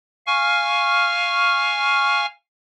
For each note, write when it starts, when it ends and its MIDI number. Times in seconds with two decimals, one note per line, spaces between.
0.27 2.26 77
0.27 2.26 80
0.27 2.26 85
0.27 2.26 89